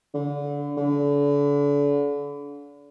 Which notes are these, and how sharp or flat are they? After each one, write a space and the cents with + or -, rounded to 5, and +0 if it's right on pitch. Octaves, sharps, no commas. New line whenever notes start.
D3 -30
D3 -35